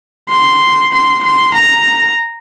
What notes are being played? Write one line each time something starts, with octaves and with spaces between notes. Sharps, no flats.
C6
C6
C6
A#5